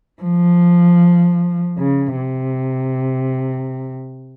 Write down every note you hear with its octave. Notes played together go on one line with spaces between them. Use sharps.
F3
C#3
C3